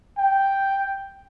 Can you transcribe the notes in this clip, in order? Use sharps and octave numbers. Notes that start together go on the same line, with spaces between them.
G5